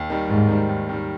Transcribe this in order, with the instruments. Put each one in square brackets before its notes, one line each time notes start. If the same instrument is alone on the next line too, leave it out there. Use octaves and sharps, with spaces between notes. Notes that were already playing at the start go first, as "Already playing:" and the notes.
Already playing: [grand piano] D#2
D#3 G3
[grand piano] D#2 [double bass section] G#2
[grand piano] D#3 G3
D#2
D#3 G3